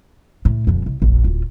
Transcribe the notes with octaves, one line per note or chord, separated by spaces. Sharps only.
A2
D#1 F2
C2
F1 A#1
D1 F4